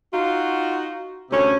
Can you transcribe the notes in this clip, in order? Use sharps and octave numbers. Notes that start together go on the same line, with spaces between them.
D#4 F4 F#4
D2 C3 C#4